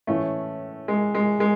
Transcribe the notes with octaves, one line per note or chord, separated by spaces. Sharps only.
A2 E3 A3 C#4
G#3
G#3
G#3